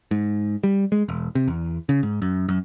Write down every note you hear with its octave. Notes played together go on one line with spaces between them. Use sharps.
G#2
G3
G#3
E1
C3
E2
C#3
G#2
F#2
F#2